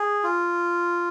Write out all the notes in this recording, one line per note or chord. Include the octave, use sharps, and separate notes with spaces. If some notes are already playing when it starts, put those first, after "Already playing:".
Already playing: G#4
F4